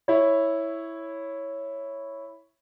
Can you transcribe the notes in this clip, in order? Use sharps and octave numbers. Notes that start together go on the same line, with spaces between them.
E4 C#5